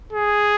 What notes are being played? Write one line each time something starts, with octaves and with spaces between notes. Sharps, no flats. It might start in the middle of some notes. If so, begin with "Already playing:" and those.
G#4